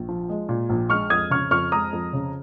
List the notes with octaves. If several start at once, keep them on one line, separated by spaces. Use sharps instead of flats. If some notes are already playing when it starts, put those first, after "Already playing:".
Already playing: A#1
F3
G#3
A#2
A#1
G#3 C#6 F6
F2 D#6 G#6
C#3 C#6 F6
F2 C#6 F6
G#3 A#5 D#6
F2
C#3